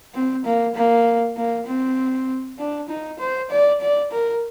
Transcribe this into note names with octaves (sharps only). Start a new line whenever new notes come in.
C4
A#3
A#3
A#3
C4
D4
D#4
C5
D5
D5
A#4